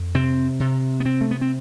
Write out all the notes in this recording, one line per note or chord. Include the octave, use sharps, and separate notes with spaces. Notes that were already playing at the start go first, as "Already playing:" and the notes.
Already playing: F2
C3 C4
C3
B3
C3 C4
A3
B3
C4